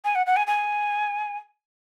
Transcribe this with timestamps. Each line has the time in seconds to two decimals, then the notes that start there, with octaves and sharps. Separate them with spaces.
0.05 G#5
0.15 F#5
0.26 F#5
0.37 G#5
0.47 G#5